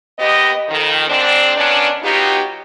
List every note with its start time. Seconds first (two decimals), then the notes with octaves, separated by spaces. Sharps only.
0.19 D#2 B3 G4 D#5
0.69 F2 D#3
1.08 G#2 C4 D4
1.55 D#3 B3 C#4 D4
2.03 F#3 B3 D#4 F4 G4